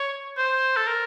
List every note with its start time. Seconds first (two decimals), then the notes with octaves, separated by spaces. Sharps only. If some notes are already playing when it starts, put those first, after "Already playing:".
Already playing: C#5
0.37 C5
0.77 A4
0.87 A#4